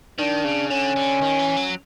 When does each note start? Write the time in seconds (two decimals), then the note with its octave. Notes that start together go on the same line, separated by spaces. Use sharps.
0.18 D#3 D4
0.44 C#3
0.70 D3 C#4
0.96 D3
1.21 D#3
1.39 E3
1.56 F#3